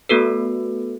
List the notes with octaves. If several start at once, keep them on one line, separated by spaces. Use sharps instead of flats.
A3 B3 F#4 A4 B4